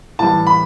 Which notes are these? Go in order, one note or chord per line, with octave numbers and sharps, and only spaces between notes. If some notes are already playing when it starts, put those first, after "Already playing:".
A2 E3 G3 A5
B5